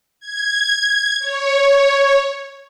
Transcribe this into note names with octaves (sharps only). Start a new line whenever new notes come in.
G#6
C#5